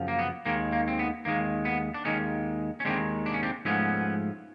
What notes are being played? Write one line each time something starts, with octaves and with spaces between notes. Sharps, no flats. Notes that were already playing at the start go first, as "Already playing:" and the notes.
Already playing: F#2 C#3 F3
A#3
B3
D#2 D#3 G#3 A#3
A#3
C4
B3
D#2 D#3 G#3 A#3
B3
D4
D#2 D#3 G#3 C#4 D#4
C#4
D#2 D#3 G#3 C4 D4
D4
C#4
C4 D4
G#2 F3 A3 B3 C#4